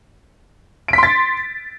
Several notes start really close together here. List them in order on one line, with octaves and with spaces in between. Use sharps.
D7 B6 C6 A6